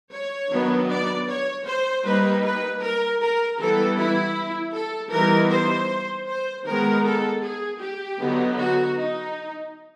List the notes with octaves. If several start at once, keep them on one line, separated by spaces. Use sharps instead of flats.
C#5
D#3 F#3 B3 D4
D5
C#5
C5
G3 A#3 D#4 B4
B4
A#4
A#4
E3 G3 B3 A4
E4
A4
E3 G3 B3 D#4 A#4
C5
C5
D#3 G#3 B3 A#4
A4
G#4
G4
D3 F#3 B3 D#4
F#4
D#4